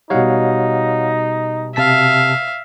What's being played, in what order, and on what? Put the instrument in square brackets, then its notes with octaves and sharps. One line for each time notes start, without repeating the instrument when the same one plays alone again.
[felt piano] B2 G3 [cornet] D#4 [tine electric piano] C#5 F5 F#5
[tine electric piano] C3 A5 B6 [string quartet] E5 F5